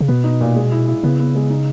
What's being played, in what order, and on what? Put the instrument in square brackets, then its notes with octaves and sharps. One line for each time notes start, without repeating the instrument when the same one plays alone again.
[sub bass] C#3
[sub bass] B2 [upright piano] B3
[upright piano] D#4
A#2
G#3
E4
E4
[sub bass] C#3 [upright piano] B3
[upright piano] B3
G#3
D#4